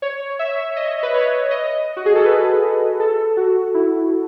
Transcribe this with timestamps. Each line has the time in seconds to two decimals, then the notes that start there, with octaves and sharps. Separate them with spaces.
0.02 C#5
0.39 E5
0.77 D#5
1.03 B4
1.14 C#5
1.51 D#5
1.97 F#4
2.06 G#4
2.15 A4
2.25 B4
3.00 A4
3.37 F#4
3.74 E4